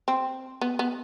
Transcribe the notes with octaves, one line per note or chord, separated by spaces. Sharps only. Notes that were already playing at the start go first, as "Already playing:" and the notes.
C4
B3
B3